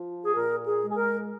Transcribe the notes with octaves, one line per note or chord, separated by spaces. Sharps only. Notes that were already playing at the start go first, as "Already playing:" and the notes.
Already playing: F3
G#4
A#2 A#4
G#4
G#3
G#4
A#4